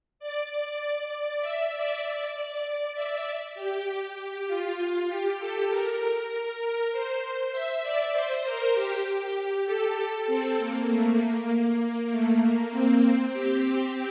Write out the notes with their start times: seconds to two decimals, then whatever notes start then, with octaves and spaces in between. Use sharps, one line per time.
0.19 D5
1.11 D5
1.41 E5
1.72 D5
2.63 D5
2.94 E5
3.55 G4
3.85 G4
4.47 F4
5.08 G4
5.38 A4
5.69 A#4
6.61 A#4
6.92 C5
7.21 C5
7.52 E5
7.83 D5
8.13 C5
8.44 A#4
8.75 G4
9.05 G4
9.66 A4
9.97 A4
10.27 C4
10.58 A#3
10.88 A3
11.19 A#3
12.11 A3
12.41 A#3
12.71 C4
13.33 G4